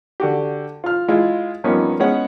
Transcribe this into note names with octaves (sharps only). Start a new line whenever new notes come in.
D3 F#4 G4
F4 F6
G#3 E4 F4
G2 F3 A#3 B3 C#4 D#4
G#3 B3 C#4 C#5 F#5